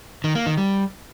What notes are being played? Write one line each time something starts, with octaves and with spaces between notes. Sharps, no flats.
D#3
A#3
D#3
G3